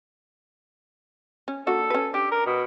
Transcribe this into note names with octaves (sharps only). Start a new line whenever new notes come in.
C#4
A#3 D4 F#4 A4
C#4 B4
D4 G4
A#4
B2